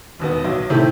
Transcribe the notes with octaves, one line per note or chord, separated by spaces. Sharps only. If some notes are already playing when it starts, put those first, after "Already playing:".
E1 D#2 B3
B1 F#3
A2 C3 D#3 A3 E4 G4